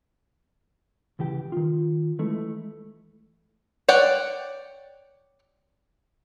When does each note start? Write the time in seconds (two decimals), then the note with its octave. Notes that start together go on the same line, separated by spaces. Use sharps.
1.19 C#2 E3 G4 G5
1.52 D#3 F4
2.19 E3 G#3 A3 E4
3.89 C#5 D5 F#5 G5